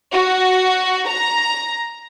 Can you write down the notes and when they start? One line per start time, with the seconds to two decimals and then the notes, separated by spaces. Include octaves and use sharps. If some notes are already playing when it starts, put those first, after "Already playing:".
0.12 F#4
1.08 A#5